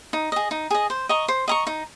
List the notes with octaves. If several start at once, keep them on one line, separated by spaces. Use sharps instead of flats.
D#4
G#4 D#5
D#4
G#4 D#5
C5
D#5 A#5 C#6
C5
D#5 A#5 C#6
D#4